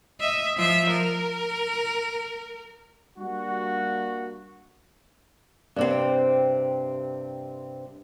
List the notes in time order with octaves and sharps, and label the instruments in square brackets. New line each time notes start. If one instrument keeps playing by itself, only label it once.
[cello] D#5 E5
F3 E5
A#4
[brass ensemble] G3 A#3 D4 F#4
[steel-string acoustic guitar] G2 C3 C4